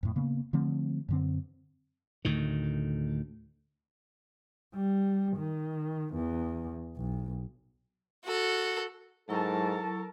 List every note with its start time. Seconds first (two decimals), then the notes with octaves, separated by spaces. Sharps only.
0.03 F2 A2
0.16 C#3 A#3 B3
0.53 D3 F3 A3 C4
1.09 F#2 D3 C4
2.25 D2 A2 D#3
4.75 G3
5.37 D#3
6.15 E2
6.97 B1
8.25 F#4 A4
9.29 G#2 F#3 E4 A4 A#4 A5 C#6